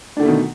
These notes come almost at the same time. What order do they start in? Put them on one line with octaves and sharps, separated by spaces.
D4 D3 A3 B2 D#3